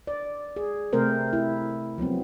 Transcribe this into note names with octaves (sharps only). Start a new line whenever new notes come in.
D5
G#4
C3 A3 C4 A#4 C5
E4
F3 F#3 B3 C4